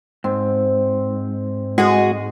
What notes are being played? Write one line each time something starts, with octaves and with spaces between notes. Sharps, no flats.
G#2 C4
G#3 F#4 G#4